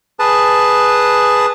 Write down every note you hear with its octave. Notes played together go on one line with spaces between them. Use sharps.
G#4 B4 A5